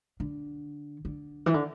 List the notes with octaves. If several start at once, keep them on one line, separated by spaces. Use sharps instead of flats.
D3
D3
E3
D3